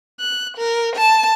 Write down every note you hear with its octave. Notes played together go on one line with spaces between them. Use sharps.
F#6
A#4
A5